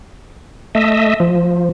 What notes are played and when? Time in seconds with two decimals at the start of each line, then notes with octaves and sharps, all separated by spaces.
0.75 A3 D#5 E5
1.20 F3